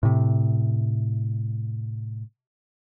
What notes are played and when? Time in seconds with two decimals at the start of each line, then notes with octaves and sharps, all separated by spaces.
0.03 A2 C3